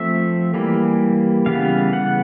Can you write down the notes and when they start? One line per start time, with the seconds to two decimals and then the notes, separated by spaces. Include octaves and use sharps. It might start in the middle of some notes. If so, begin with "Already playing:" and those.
Already playing: F3 A3 C4 E5
0.54 E3 G3 A#3
1.46 C#3 E3 G3 B3 F5
1.93 F#5